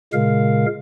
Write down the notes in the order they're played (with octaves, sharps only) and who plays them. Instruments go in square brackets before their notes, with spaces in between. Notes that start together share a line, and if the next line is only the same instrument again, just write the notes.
[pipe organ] A#2 C#3 G#3 A#4 F5